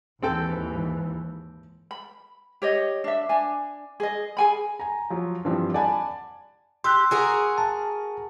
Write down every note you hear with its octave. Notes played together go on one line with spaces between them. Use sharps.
D#2 G#2 E3 C4 A4 G5
B5
G4 C#5 D#5
D4 E5
D4 G#5
G#4 D#5
G#4 G#5 B5
G#5 A#5
F3 F#3
G2 E3 F3 G3 C4
D5 F#5 G#5 A5 B5
G4 C6 E6 F#6
F#4 G#4 A#4
A5